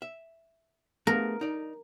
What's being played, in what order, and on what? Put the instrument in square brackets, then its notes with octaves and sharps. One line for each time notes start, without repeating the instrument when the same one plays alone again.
[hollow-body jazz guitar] E5
[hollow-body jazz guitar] A3 B3 G#4 [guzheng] A#4
[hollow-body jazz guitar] D#4 D5